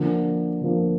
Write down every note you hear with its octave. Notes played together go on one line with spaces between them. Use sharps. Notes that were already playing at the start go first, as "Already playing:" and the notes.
Already playing: D3 F3 A#3
D3 F3 A#3